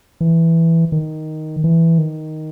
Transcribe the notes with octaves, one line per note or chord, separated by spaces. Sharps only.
E3
D#3
E3
D#3